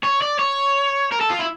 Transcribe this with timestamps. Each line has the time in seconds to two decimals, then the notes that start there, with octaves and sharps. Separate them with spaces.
0.03 C#5
0.22 D5
0.39 C#5
1.12 A#4
1.20 A4
1.30 F4
1.39 E4